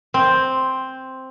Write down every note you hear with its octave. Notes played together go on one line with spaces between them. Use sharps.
C4